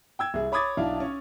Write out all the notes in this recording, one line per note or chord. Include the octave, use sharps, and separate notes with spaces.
G5 E6 G#6
C2 G#4
C#5 B5 D6 D#6 G#6 A6
B1 D4 E4 F5
C#4 C#5